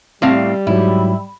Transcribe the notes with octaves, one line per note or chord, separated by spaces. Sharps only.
A2 G3 C4 F5
G#2 F#3 E4